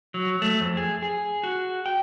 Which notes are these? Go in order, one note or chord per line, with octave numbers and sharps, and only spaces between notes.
F#3
A3
F2
G#4
G#4
F#4
G5